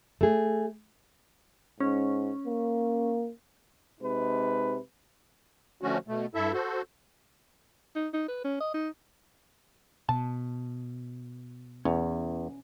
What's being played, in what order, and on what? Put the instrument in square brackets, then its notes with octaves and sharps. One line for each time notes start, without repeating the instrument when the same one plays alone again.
[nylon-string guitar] A3 G#4
[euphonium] G#2 [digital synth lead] C#4
[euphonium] A#3
[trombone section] C3 G#3 D#4 B4
[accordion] D3 F3 A3 C#4 F#4
B2 A3
G2 E4 A4 E5
F#4 A4 C5
[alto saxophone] D#4
D#4
B4
C#4
D#5
D#4
[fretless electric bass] B2 [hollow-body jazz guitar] A5
[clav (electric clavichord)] E2 [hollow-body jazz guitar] C#4